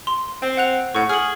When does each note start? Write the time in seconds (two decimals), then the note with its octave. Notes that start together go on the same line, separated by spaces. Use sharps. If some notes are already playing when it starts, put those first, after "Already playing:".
0.07 C6
0.42 C4 G5
0.57 F#5 F#6 F7
0.95 A2 F#5 C#6
1.09 G#4 F6 F#7